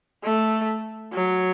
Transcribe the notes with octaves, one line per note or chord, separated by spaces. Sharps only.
A3
F#3